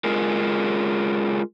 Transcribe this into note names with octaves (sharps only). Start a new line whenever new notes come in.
G#3 F4 G#4 A#4